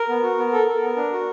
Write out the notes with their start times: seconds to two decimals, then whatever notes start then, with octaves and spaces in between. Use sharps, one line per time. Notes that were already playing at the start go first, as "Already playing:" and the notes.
Already playing: A#4
0.09 B3
0.23 F#4
0.38 B3
0.53 A4
0.68 A4
0.83 B3
0.97 D4
1.12 F#4